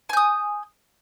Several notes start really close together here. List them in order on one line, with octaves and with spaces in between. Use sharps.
G#5 G6 D#6